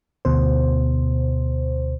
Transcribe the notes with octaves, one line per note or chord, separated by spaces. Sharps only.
D2 B2 C5